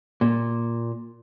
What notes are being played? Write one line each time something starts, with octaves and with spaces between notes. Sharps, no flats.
A#2